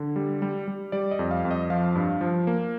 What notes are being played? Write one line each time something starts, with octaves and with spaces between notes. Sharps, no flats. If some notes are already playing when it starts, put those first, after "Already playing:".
Already playing: D3
G3
G3
G3
G3 D5
D#5
F2
F5
F2
D#5
F3 F5
G2
F3
A#3